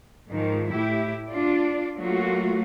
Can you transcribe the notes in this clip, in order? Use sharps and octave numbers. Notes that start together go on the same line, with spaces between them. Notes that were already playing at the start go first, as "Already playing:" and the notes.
G#2 D#3 F3
A2 E4 G4
D4 F4 D5
F#3 A3 A#3 F4 F#4